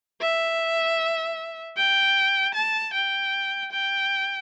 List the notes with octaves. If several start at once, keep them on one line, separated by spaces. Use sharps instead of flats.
E5
G5
A5
G5
G5